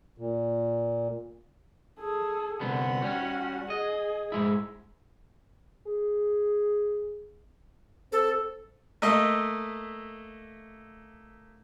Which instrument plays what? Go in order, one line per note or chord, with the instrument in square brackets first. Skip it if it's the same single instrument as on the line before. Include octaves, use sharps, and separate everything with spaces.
[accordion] A#2
[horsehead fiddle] G#4 A4
[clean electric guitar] C2 D3 B3 [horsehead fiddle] F#4 F#5
[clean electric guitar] G3 C#4
[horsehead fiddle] G#4 [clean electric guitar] D#5
[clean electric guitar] G#2 G#3 E4
[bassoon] G#4
[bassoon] C4 [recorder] A4
[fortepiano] A3 A#3 D#5 E5